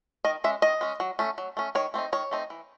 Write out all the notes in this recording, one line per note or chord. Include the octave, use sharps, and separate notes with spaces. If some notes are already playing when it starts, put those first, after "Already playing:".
D#3 D#5
G#3 C#4 E5
D#3 D#5
G#3 C#4
F#3
A3 C#4
F#3
A3 C#4
D#3 C#5
A3 C4 D#4
D#3 C#5
A3 C4 D#4
E3